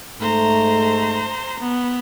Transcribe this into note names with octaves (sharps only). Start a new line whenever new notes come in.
G#2 A3 C5 A#5
B3